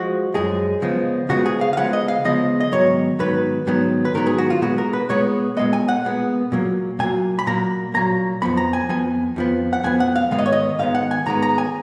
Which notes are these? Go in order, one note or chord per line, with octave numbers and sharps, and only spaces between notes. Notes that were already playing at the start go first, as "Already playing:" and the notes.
Already playing: F3 G#3 F#4
F#2 F3 G#3 G#4
C#3 F3 G#3 B3
C#3 F3 G#3 B3 F#4
G#4
F5
F5
C#3 F3 G#3 B3 F#5
D#5
F5
C#3 F3 G#3 B3 D#5
D#5
G#2 D#3 F#3 B3 C#5
G#2 D#3 F#3 B3 B4
G#2 D#3 F#3 B3
B4
G#2 D#3 F#3 B3 A#4
G#4
F#4
F4
A#2 G#3 B3 F#4
A#4
B4
A#2 G#3 B3 C#5
A#2 G#3 B3 D#5
G#5
F#5
A#2 G#3 B3
A#2 F#3 A#3
A#2 F#3 A#3 G#5
B5
A#2 F#3 A#3 A#5
A#2 F#3 A#3 A#5
F2 F3 B3 B5
A#5
G#5
F2 F3 B3 G#5
F2 F3 B3
F#5
F2 F3 B3 G#5
F#5
F5
G#2 D#3 G#3 B3 F5
D#5
C#5
D#5
G#2 D#3 G#3 B3 F5
F#5
G#5
G#2 D#3 G#3 B3 A#5
A#5
G#5